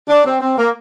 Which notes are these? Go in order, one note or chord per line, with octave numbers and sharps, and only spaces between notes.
D4
C4
C4
A#3